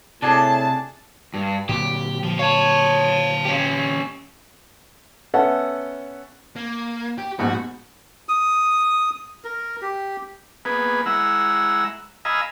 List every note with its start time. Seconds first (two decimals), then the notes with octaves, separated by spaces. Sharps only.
0.22 A2 C3 D4 G#4 A5
1.34 G2
1.69 A#2 D3 F#3 G4
2.23 F3
2.39 C#5 F5 A5
3.45 C#4 G4
5.34 B3 C#4 A4 E5 F#5
6.56 A#3
7.18 G4
7.39 A#1 G#2 B2 F#4
8.29 D#6
9.45 A#4
9.82 G4
10.65 A#3 B3 G#4 B4
11.06 G#3 E4 F#5 A#5 E6
12.25 D#5 F5 G#5 A#5 B5 E6